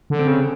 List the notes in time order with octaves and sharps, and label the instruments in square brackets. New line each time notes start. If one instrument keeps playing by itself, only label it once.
[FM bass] D3
[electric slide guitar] C4
[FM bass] C#3